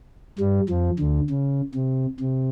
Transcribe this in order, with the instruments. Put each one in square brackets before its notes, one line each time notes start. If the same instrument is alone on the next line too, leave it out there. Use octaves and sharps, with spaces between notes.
[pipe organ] G2 G3
F2 F3
D2 D3
C#3
C3
C3